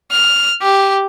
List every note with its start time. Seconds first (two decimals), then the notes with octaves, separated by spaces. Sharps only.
0.11 F6
0.62 G4